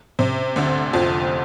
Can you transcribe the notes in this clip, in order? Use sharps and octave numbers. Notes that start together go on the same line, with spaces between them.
C3
D2 D3
F2 F3